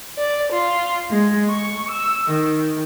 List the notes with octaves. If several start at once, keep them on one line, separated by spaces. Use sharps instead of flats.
D5
F4
G#3
C#6
E6
D#3